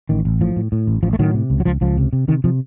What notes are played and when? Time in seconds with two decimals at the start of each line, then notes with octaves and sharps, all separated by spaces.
0.09 A1 D#3
0.25 A1
0.41 A2 F3
0.56 A2
0.72 A2
0.88 A1
1.03 A1 F3
1.13 A3
1.19 A2 D#3 F#3
1.34 C3
1.50 C#2
1.60 F#3
1.65 C#2 F3
1.81 C#2 F3
1.97 C3
2.13 C3
2.28 C3 D#3
2.44 C3 F3